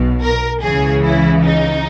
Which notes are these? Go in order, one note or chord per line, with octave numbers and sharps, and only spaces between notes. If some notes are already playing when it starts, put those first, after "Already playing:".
Already playing: B1 B2
A#4
C#2 C#3 E3 G#4
E4
D#4